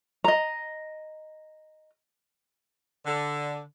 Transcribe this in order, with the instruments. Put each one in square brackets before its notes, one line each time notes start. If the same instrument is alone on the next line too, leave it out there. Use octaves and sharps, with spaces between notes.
[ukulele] D#5 A#5
[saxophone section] D3